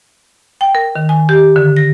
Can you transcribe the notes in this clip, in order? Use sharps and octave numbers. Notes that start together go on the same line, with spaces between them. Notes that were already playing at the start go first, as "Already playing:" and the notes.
G5
A#4
D#3
G#5
G4
D3
A#6